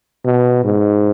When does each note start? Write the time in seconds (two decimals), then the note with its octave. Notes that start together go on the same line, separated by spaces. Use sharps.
0.25 B2
0.64 G#2